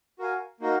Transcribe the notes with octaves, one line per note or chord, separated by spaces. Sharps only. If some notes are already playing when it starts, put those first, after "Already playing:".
F#4 A#4 F5 G#5
A#3 D#4 F#4 A#4 F5